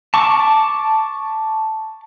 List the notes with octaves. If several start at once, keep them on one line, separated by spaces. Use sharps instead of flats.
A5 C#6 D6